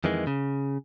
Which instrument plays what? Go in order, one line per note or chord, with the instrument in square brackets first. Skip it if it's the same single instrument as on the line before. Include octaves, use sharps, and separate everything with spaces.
[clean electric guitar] F2 D#3 E3 G#3
C#3